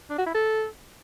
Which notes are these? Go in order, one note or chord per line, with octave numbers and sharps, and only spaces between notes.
D4
F#4
E4
A4